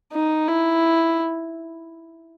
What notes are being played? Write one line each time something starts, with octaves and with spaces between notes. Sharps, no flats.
D#4
E4